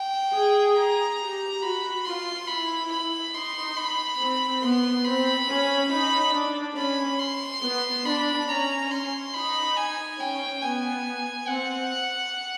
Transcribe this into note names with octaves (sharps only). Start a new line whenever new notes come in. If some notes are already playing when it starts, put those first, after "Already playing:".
Already playing: G5
G#4
A#5
G4
F#4 B5
F4 C6
E4 B5
B5
D#4 C6
B5
C4
B3 C6
C4 B5
C#4
D#4 B5
D4
C#4 B5
C6
B3
D4 B5
C#4 A#5
C6
D#4 B5
G#5
C#4 G5
B3 G#5
C4 F#5